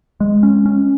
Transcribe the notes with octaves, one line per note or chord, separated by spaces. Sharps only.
G#3
C#4
C#4